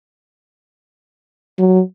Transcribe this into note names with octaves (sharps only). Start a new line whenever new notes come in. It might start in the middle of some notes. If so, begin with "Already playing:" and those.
F#3